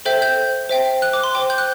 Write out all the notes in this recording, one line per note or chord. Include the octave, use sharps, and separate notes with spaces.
A4 C5 E5 G5 G6
G6
C5 E5 G5
F#6
D6
C6
C5 G5 D6
G6
F#6